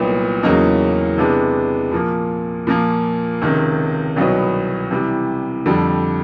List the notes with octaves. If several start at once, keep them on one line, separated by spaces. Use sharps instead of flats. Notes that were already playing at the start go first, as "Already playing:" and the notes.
Already playing: C2 A#2 F#3 B3 D#4
E2 C#3 F#3 A#3 D#4
C3 E3 G#3 B3 D4
A#2 F3 A#3
A#2 F3 A#3
C#2 C3 D#3
C2 B2 F#3 B3 D#4
C3 E3 G3
F2 D3 G3